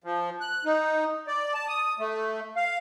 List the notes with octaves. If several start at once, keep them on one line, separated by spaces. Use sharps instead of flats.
F3
F#6
D#4
D5
A5
D#6
A3
F5